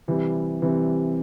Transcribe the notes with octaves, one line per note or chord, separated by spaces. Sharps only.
C3 E3 G3
C3 E3 G3